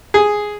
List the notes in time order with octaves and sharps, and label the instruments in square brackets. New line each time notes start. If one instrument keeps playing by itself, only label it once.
[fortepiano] G#4